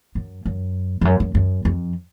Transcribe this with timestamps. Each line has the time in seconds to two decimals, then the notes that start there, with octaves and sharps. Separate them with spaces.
0.15 F#2
0.45 F#2
1.01 F2
1.05 F#2
1.20 F#2
1.35 F#2
1.65 F2